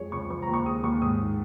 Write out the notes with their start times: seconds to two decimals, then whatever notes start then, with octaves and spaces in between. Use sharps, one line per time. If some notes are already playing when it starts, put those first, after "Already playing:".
Already playing: F2 G#3 C#5
0.12 C#2 C#6
0.30 F3 C#6
0.42 A#5
0.48 D#2
0.53 C#6
0.66 G#3 D#6
0.84 D#2 C#6
1.02 G#2 D#6